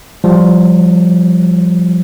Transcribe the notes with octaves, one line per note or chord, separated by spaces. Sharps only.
F3 G3